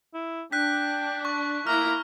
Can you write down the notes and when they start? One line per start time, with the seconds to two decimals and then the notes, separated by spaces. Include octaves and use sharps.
0.14 E4
0.52 D4 G5 F#6 B6
1.25 C#6
1.67 A#3 E4 A#5 F6